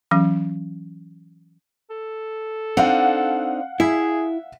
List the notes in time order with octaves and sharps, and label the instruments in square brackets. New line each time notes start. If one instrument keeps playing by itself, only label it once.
[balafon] E3 F#3 C#4
[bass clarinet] A4
[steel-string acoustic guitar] C4 D4 D#4 [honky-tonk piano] F5 F#5
[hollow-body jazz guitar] E4 [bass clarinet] G#4 [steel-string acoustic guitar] E5